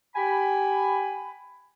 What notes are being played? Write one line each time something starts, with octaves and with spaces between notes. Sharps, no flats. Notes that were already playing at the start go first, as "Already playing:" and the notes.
G4 G#5 B5